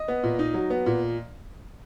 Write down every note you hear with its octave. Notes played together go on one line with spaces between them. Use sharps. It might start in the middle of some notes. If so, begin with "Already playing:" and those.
Already playing: D#5
B3
A#2
D#4
F#3
B3
A#2